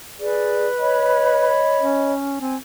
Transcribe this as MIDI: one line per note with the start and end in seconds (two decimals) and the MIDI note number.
0.20 0.66 68
0.20 1.62 71
0.20 0.66 74
0.80 2.13 73
0.80 2.13 75
0.80 2.13 83
1.80 2.39 61
2.40 2.56 60
2.40 2.56 80